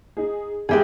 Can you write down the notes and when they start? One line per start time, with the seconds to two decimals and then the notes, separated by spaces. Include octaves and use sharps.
0.17 D#4 G#4
0.69 E2 G#3 G4 G#4 E5